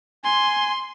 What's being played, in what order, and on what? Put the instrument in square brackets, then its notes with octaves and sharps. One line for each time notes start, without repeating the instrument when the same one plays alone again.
[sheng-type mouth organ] G#5 [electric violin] C6